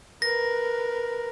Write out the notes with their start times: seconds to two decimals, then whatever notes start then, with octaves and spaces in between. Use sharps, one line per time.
0.22 A#4 B4 A#6